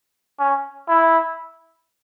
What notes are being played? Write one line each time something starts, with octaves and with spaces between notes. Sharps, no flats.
C#4
E4